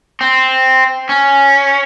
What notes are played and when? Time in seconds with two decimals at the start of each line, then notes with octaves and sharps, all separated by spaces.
0.21 C4
1.09 C#4